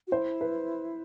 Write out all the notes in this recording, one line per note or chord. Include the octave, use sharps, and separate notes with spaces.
F#4
E4 C5
B4